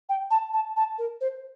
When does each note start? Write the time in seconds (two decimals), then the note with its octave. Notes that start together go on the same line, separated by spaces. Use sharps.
0.09 G5
0.31 A5
0.53 A5
0.76 A5
0.98 A#4
1.21 C5